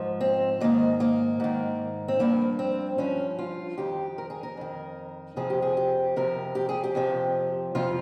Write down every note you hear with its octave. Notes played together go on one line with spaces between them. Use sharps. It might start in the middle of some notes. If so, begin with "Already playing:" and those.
Already playing: G#2 F3
C4
G#2 D#3 A#3
A#3
G#2 D#3
C4
G2 F3 A#3
C4
G2 F3 C#4
F4
F2 D#3 G4
A#4
G#4
A#4
F2 D#3
F2 C3 F3 G#4
G4
G#4
G4
F2 C3 F3 A#4
G4
G#4
G4
F2 C3 F3
F2 C3 F3 F4